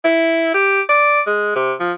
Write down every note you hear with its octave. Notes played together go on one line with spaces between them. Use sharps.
E4
G4
D5
G#3
C3
F3